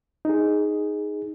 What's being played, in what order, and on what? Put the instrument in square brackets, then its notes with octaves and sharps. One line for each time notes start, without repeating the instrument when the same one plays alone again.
[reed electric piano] D#4 G#4